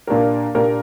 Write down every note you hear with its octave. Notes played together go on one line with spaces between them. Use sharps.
A#2 A#3 D4 G4 A#4
A#2 A#3 D4 G4 A#4